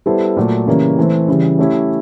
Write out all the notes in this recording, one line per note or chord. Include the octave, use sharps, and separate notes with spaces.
G3 B3 E4 A4 C5
A#2 F#3 A3
C#3 E3 G3 A#3 C#4
E3 A3 C4
C#3 E3 G3
A3 C#4 E4 G4